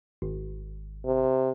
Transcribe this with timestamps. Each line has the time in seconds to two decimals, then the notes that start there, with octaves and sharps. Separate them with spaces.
0.22 G#1
1.06 C3